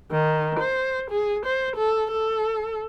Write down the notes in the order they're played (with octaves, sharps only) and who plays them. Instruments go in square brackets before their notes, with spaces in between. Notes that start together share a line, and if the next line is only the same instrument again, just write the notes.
[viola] D#3
C5
G#4
C5
A4
A4